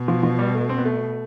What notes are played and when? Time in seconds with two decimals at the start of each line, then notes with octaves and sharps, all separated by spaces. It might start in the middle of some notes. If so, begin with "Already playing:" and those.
Already playing: B2
0.08 F3
0.23 F3
0.39 G3
0.55 A3
0.69 C4
0.78 B3
0.85 A3